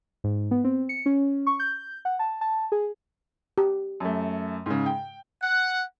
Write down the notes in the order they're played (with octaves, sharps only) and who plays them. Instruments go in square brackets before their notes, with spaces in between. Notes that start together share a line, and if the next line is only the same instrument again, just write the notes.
[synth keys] G#2
B3
C4
C#7
C#4
C#6
G6
F#5
A5
A5
G#4
[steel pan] G4
[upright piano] F#2 A3
G#2 C#3
G5
[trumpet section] F#5